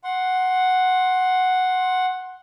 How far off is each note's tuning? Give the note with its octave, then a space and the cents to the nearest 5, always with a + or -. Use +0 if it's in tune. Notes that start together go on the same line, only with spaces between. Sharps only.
F#5 +0 C6 +15